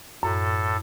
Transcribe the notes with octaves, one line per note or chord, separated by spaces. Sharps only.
F#2 A2 A4